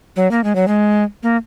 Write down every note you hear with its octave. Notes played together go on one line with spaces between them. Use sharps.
F#3
A#3
G#3
F#3
G#3
A#3